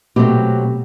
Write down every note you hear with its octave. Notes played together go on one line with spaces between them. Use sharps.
B2 F#3 A3 C4 G4